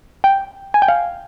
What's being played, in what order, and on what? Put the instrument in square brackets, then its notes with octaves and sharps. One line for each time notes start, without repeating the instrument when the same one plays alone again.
[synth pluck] G5
G#5
G5
F5